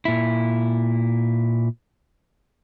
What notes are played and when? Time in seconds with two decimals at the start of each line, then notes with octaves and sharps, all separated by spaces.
0.05 A#2 E4